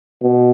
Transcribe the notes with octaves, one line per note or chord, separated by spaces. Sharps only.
B2